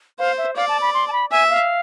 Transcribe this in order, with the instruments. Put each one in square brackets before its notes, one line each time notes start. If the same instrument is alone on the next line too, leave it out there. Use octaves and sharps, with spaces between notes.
[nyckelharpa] C5 [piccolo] F5
[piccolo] E5
[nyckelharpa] D5 [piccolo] F5
[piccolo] A5
B5
C6
A5
B5
[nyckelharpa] E5 [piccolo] G#5
[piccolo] F5